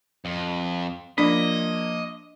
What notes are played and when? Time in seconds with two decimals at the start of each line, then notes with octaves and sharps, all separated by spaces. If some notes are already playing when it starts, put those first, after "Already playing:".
0.25 F2
1.18 F3 A#3 D4 D5 D#5